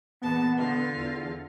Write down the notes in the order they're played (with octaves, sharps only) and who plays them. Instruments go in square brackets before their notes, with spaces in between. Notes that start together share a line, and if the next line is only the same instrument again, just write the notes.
[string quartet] E2 A#2 A5 [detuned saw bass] B3
[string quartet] D3 F4
[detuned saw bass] E2